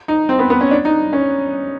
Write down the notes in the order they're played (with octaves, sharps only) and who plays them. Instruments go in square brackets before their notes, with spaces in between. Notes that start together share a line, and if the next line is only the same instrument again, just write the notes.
[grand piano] D#4
C4
B3
B3
C#4
D4
D#4
C#4